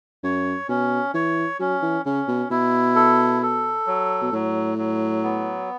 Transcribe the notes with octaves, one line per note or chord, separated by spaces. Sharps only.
F#2 C#5
B2 C#4
E3 C#5
F#3 C#4
E3
C#3 C#4
B2
B2 E4
A4
A4
F#3
B2
A2 F#3
F#3
B3